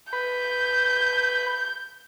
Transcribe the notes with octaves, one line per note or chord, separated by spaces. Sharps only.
B4 G6